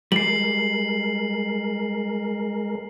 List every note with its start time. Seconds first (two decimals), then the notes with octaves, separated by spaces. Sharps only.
0.12 G3 G#3 A#4 C7 F#7